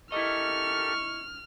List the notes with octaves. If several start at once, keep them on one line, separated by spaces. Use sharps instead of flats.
E4 G4 A4 A#4 D#5 C#6 F6